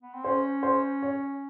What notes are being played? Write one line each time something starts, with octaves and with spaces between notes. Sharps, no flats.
B3
C4
C#4 C5
C5
C#5